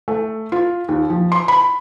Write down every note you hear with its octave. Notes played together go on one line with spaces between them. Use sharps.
A3
F4
D#2
F3
C6
B5